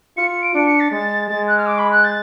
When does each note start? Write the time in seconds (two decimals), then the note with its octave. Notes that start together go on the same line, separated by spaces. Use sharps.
0.17 F4 C#7
0.29 C#7
0.42 D7
0.54 D4 C#7
0.66 C#7
0.80 A6
0.91 G#3 A6
1.28 G#3 A6
1.47 F#6
1.57 F6
1.66 D6
1.78 B5
1.91 F#6
2.04 A6